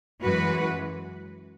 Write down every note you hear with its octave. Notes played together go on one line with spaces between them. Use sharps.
F#2 E3 G#3 F#4 B4